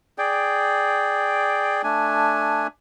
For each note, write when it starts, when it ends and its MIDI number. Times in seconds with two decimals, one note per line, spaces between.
0.18 1.82 68
0.18 1.82 74
0.18 1.82 79
1.84 2.67 57
1.84 2.67 62
1.84 2.67 80